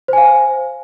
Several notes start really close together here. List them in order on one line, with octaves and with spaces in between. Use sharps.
C5 G#5 F5